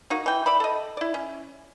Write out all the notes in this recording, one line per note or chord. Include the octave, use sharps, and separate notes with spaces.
A#3 D#4 F#4
E3 G5
D5 E5 B5
A4 D#5
E4 D5
C#4